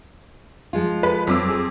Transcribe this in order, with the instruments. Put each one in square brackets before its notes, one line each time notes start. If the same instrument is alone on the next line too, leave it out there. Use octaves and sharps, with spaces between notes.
[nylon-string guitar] F3 G#3 F4
[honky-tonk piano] B4
[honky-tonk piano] F2 D6 E6 [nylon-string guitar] F#3
[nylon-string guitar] G#4